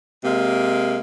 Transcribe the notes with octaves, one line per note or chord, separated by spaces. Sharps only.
C3 G#3 A#3